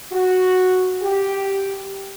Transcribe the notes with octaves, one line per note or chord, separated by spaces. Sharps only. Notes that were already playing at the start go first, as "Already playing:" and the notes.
F#4
G4